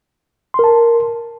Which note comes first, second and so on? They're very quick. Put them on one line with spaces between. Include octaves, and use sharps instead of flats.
C6 A#4 A5